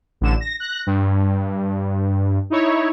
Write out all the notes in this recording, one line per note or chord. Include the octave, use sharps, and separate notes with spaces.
A1 D3 E7
A#6
F#6 A#6
G2
D#4 E4 C#5